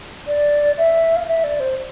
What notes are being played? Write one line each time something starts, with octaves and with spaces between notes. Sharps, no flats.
D5
E5
F5
E5
D5
C5